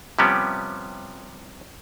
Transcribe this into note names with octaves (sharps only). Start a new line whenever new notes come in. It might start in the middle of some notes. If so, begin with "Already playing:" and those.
C3 F3 G3 B3 C#4 G4